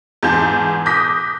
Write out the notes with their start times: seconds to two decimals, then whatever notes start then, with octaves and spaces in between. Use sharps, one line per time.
0.23 E2 G#2 A5 G6
0.86 D6 D#6 F#6 G6 A#6 B6